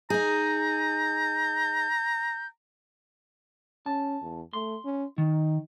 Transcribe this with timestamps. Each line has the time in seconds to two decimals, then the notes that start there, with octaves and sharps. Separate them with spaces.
0.10 D#4 G#4 A#5 G6
3.86 C#4 A5
4.22 E2
4.53 A3 C6
4.85 C#4
5.18 D#3 D#4